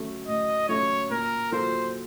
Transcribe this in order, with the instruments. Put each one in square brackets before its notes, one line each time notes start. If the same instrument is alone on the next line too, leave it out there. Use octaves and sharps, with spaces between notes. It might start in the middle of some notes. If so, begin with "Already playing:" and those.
Already playing: [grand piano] F#3 A3 C#4
[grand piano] A2 [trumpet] D#5
[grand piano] F#3 A3 C#4 [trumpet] C#5
[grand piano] A#2 [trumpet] A#4
[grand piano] F#3 A#3 F4 A4 [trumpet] C5